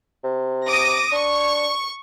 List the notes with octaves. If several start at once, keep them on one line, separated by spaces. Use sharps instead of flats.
C3
D6 D#6 A#6
D4 C#6